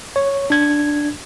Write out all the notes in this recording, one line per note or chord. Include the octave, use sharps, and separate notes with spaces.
C#5
D4 G#6